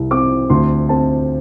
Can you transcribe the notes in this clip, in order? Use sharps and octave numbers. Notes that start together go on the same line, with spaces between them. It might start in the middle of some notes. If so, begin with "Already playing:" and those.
Already playing: C2
C4 D6
D2 C6
C4 A5